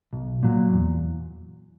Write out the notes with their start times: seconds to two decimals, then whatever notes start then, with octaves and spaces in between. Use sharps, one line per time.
0.13 B1
0.43 A#2 F#3
0.73 E2